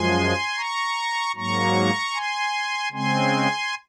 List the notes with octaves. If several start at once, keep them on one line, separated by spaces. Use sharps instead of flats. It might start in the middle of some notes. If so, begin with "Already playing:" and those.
Already playing: F#2 F3 G#3 G#5 C6
A#5 C#6
G#2 F#3 A#3 A#5 C#6
G#5 C6
C#3 G#3 C4 G#5 C6